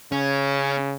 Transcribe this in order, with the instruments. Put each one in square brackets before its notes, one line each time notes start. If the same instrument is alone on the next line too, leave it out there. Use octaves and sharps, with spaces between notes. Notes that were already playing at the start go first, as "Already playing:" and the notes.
[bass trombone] C#3 [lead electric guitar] C#4